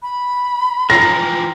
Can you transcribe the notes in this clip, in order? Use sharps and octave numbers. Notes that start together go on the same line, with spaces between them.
B5
E3 F3 G5 A#5 A#6 C7